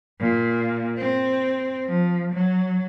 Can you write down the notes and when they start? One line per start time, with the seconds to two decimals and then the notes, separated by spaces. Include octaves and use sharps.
0.20 A#2
0.98 C4
1.88 F3
2.33 F#3